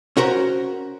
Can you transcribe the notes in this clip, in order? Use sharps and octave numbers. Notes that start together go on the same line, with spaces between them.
C#4 F#4 A#4 C5